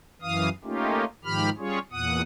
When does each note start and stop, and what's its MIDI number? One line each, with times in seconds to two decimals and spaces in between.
0.22 0.49 42
0.22 0.49 52
0.22 0.49 77
0.22 0.49 87
0.64 1.05 57
0.64 1.05 58
0.64 1.05 61
0.64 1.05 63
0.64 1.05 65
0.64 1.05 67
1.25 1.50 44
1.25 1.50 51
1.25 1.50 53
1.25 1.50 67
1.25 1.50 83
1.25 1.50 89
1.58 1.79 55
1.58 1.79 61
1.58 1.79 65
1.58 1.79 68
1.58 1.79 73
1.92 2.22 40
1.92 2.22 46
1.92 2.22 78
1.92 2.22 87